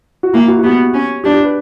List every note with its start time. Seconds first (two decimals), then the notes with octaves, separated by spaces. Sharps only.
0.23 F#4
0.33 A#3 E4
0.48 F#4
0.59 F#4
0.63 B3 G4
0.94 C#4
1.24 D4 G4
1.34 G4
1.44 B4